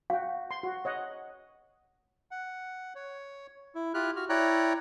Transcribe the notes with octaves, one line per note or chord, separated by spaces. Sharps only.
F#4 F5 G5
C6
F#4
C#5 D#5 F#5
F#5
C#5
E4
E4 F4 G4 F6 F#6
F#4 F6
E4 C#5 D5 G5 A#5 F#6